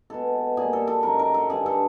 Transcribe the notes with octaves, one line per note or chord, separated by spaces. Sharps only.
B2 G#3 A4
A#2 G3 G#4
A4
A4
F#2 D#3 G#3 A#4
A#4
A4
G2 D3 G3 G#4
A4